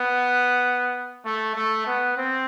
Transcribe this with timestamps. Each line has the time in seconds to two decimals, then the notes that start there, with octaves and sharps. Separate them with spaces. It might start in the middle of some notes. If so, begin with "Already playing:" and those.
Already playing: B3
1.25 A3
1.56 A3
1.87 B3
2.17 C4